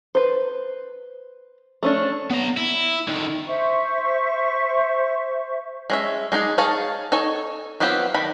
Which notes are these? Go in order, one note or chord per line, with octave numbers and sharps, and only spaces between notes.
B4 C5
A3 C#4 D4
B3 A#5
E4
D3 D#3
C5 E5 C#6
G#3 C#4 E5
G#3 D4 D#4 G#4
D#4 G#4 C#5 F5 A5
D#4 A4 C#5 G#5
F#3 B3 C4 F4 G4
D#3 B5